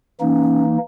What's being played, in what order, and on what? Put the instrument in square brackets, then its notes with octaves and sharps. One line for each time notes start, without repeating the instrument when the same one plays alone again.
[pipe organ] E3 A#3 D#4 [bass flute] C#4